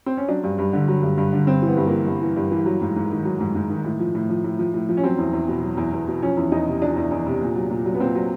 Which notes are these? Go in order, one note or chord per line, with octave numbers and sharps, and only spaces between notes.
C4
C#4
F#3 D4
G2
G2
D3
F#3
G2
G2
D3
G2 C4
E3 B3
G2
E3 A#3
G2
E3
G2
E3
F#3
G#2
G#2
D#3
F#3
G#2
G#2
D#3
A2
F3
A2
F3
A2
F3
A2
F3
C#4
F#3 C4
E2
E2
B2
F#3
E2
E2
B2
F3 C#4
E2
E2 D#4
C3
F3 D4
E2
E2
C3
A#2
F#3
A#2
F#3
B3
A#2 C4
F#3